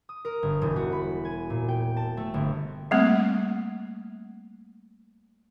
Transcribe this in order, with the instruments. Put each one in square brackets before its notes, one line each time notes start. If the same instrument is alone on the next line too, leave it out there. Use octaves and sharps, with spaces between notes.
[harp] D#6
A#4
G1
E1
F#4
B5
G#5
A#2
G5
A5
A3
G1
[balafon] G3 A3 A#3 C4